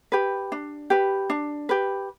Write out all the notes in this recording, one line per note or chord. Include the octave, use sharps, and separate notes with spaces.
G4 B4
D4
G4 B4
D4
G4 B4